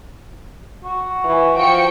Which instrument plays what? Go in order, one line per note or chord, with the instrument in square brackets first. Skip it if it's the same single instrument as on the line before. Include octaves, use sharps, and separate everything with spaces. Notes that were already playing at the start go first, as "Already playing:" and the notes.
[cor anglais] F#4
[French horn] E3
[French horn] F3 [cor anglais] F#4 [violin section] G5 C#7